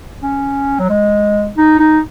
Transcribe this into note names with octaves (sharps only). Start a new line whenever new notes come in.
C#4
F#3
G#3
D#4
D#4